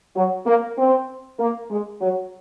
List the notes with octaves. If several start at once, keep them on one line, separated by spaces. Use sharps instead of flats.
F#3
A#3
C4
A#3
G#3
F#3